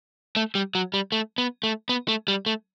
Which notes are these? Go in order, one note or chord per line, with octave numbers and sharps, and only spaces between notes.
A3
G3
F#3
G3
A3
B3
A3
B3
A3
G3
A3